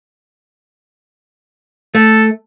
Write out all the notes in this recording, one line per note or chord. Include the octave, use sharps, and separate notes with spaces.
A3 A4